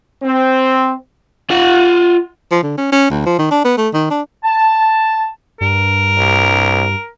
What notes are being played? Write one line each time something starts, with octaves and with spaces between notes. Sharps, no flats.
C4
F4 F#5
F3
D3
C#4
C#4
D2
F3
D#3
D4
B3
A3
D#3
D4
A5
G2 A#4
C2